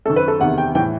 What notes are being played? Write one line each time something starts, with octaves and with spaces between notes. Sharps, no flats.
F#2 D#3 A4
B4
A4
E2 C3 D#3 F#5
G5
A2 E3 G5